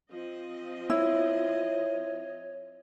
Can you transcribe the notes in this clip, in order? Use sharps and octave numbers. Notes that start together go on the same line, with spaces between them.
F3 C4 D#5
E4 C#5